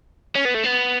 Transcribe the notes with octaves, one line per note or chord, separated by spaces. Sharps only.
C#4
B3
A3
B3